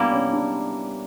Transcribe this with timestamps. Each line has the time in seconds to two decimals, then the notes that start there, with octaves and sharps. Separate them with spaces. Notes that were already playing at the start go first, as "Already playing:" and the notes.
Already playing: G3 A#3 B3 D4 E4
0.12 C#4
0.33 D4